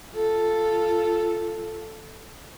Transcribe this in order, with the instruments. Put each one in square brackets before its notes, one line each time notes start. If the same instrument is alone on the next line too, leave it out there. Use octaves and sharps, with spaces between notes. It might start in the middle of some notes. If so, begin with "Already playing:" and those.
[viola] F4 A4